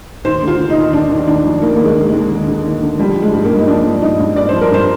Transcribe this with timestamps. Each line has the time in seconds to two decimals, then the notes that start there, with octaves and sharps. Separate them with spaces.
0.25 D#2 C5
0.43 D3
0.48 F4
0.59 D3
0.70 D#4
0.76 D#2
0.93 D#2 D4
1.11 D#2
1.27 D#2 D4
1.45 F3
1.62 D#2 A#3
1.76 D#2 A#3
1.85 G#3
1.96 D3
2.08 D#2 G#3
2.31 D3
2.47 D3
2.65 D#2
2.82 D3
2.99 F3 G3
3.16 F3
3.22 G#3
3.33 G2
3.44 A#3
3.51 G2
3.59 D#4
3.68 F3 D4
3.85 F3
4.02 G2 D#4
4.19 G2
4.36 G2 D5
4.49 F3 C5
4.61 A#4
4.71 G2 C5